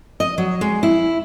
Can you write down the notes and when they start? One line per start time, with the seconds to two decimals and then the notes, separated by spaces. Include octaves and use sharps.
0.20 D#5
0.38 F#3
0.61 G#3
0.83 E4